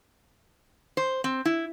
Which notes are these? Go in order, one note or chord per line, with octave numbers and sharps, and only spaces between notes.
C5
C4
E4